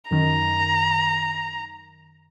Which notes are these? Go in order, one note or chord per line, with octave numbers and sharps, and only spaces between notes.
F#2 D#3 A#5